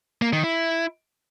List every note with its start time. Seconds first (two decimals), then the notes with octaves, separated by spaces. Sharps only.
0.22 A#3
0.33 D#3
0.44 E4